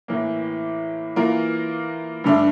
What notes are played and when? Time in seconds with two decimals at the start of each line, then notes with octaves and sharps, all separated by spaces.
0.08 A2 E3 A#3
1.16 E3 A#3 F4 A#4
2.24 G2 D3 A3 D4